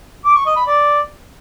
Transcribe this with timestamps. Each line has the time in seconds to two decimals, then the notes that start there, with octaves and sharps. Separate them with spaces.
0.25 D6
0.35 C#6
0.46 D#5
0.56 B5
0.67 D5